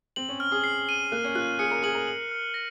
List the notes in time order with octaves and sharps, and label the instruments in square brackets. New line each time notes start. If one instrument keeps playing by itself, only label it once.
[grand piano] C4 [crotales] F#7
[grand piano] C#4
[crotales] F6
[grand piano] G#4
[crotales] C7
D#7
[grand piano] A#3 [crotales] F#6
[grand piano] C#4
[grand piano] F4 [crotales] F#6
[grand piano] G#4 [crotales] C#7
[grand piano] A#4
[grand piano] G#4 [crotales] F#7
[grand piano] A#4
[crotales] F#7
F6
A#6